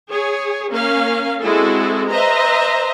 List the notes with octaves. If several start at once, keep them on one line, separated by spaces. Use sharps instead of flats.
G#4 C#5
A#3 C#4 A#4 F5
G#3 C4 E4 F#4 G#4 A4
B4 C5 D#5 E5 A#5